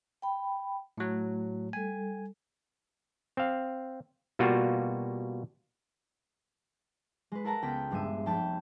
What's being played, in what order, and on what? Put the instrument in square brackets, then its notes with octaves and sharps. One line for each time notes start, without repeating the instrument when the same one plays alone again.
[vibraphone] G5 B5
[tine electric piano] A2 F#3 [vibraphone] A3
[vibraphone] G3 A4 [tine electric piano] G#5
[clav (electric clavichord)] C4 F5
B2 G3 A#3 F4 F#4
[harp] G#3 B4
A4 A#4 F#5 A5 A#5
C#2 B3 G5 B6
A#1 G2 G#3 E5 D#7
F1 G5 A5 B5